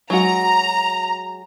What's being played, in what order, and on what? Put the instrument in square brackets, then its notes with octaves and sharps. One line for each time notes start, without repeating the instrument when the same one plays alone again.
[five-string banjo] F#3 G#3 F#4 [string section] A#5